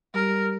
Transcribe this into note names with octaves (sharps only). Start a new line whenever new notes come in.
G3 A#4